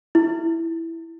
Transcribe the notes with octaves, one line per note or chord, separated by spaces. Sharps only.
E4